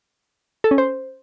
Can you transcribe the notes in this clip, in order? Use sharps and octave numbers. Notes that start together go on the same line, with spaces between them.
A4
C#4
C5